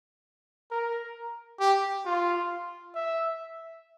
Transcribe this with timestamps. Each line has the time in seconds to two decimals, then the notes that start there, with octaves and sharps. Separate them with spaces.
0.71 A#4
1.60 G4
2.05 F4
2.95 E5